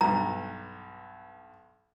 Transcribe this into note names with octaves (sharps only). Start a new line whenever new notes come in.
B1 G2 A#5